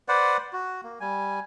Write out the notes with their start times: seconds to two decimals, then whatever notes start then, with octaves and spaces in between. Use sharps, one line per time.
0.08 B4 C5 D5 F#5
0.53 F#4
0.84 A#3
1.00 G3 G#5